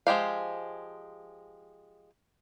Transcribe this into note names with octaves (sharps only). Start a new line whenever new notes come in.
F3 G#3 G4 F5